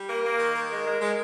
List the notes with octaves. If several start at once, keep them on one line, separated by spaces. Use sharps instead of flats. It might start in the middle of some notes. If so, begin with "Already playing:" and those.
Already playing: G3
A#3 A#4
A#3
D#3
D#3
G#3 A#4
G#3
G#3